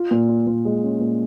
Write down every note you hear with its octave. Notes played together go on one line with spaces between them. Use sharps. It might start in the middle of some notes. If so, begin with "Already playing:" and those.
Already playing: F4
A#2
F4
A#2
G#3
C#4
A#2